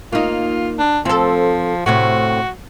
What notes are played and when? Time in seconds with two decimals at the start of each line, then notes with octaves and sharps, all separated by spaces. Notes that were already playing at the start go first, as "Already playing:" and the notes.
0.12 A#3 D#4 F4
0.79 D4
1.05 F3 C4 A4
1.86 A2 C3 C4 F#4